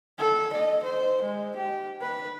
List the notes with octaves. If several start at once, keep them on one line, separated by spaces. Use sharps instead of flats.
A4
D#5
C5
G#3
G4
B4